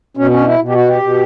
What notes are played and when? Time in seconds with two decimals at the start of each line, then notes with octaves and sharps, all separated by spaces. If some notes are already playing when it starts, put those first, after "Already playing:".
0.17 B2 C#4
0.31 C#4
0.41 D4
0.45 E4
0.59 B2
0.68 G4
0.73 F#4
0.88 G4
1.02 B2